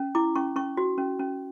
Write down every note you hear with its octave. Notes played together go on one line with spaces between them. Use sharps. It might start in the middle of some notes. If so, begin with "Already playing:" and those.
Already playing: C#4
E4 D6
C#4 C#6
C#4 C#6
F#4
C#4
C#4